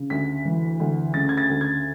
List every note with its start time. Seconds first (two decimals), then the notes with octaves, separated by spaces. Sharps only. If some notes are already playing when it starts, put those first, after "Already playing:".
Already playing: C#3
0.10 D2 B6
0.45 E3
0.80 D2
1.14 C#3 A6
1.29 G#6
1.38 A6
1.50 D2
1.61 G#6